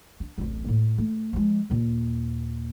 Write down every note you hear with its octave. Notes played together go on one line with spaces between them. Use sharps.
D4
D1 A1
A2
A3
F3 G#3
D#2 A#2